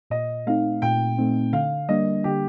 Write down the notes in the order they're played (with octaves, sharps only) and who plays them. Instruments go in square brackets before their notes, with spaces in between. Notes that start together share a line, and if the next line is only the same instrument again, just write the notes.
[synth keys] A#2 [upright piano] D#5
[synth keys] A3 C4 D#4 [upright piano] F5
[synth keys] A#2 [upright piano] G5
[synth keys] A3 C4 D#4
[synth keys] D3 [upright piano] F5
[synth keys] G3 A#3 D4 [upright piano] D#5
[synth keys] D3 [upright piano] G4